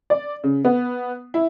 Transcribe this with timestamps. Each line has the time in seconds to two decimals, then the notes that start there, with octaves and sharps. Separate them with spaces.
0.10 D5
0.44 C#3
0.65 B3
1.34 E4